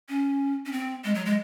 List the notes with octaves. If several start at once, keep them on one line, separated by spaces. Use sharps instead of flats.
C#4
C#4
C4
G#3
F#3
G#3